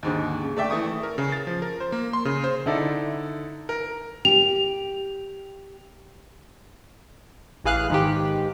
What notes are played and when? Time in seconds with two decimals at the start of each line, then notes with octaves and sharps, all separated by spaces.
0.03 D#2 G#2 D3
0.43 C#3
0.57 A3 D5 E5 G5
0.70 E3 A3 C#6 D#6
1.03 A#4
1.18 C#3
1.32 A6
1.47 F3
1.62 A#4
1.80 C5
1.92 A#3
2.13 C6
2.25 C#3
2.44 C5
2.66 D3 D#4 E4 A4 D5
3.69 A#4
4.25 G4 F7
7.64 A1 E3 G#4 F5 F#6
7.90 G#2 D#3 G4